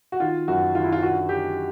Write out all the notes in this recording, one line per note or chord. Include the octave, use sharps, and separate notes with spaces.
F#4
D#3 F4
F#2 F#4
D#3 F4
E4
F4
D3 F#4
D3 G4